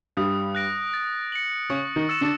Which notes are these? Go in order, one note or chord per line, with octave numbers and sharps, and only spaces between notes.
G2 G3 D#6
F#6 A#6 D7
A6
C#7 F#7
C#3 C#4 C#6
D#3 D#4
E6 A6 C#7 E7
D3 D4